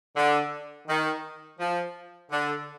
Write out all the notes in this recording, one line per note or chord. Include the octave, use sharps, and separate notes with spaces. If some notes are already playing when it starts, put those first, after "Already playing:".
D3
D#3
F3
D3